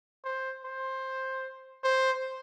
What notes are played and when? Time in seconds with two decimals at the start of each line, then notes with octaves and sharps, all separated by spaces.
0.25 C5
0.65 C5
1.84 C5